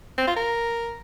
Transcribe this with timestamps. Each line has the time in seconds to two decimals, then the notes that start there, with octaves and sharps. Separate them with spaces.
0.18 C4
0.27 F4
0.36 A#4